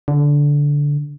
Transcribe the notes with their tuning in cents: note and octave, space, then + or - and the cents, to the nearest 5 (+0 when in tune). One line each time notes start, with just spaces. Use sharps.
D3 -15